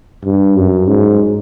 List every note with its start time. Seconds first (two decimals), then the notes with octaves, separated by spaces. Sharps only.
0.25 G2
0.56 F#2
0.88 G#2